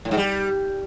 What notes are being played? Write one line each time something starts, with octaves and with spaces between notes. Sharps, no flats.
A2
G#2
G3